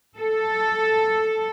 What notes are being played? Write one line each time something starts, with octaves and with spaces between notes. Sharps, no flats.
A4